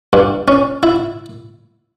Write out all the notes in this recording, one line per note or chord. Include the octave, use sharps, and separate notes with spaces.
G2
C#4
E4